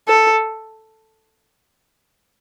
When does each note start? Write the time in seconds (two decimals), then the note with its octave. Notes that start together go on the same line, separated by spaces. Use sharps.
0.08 A4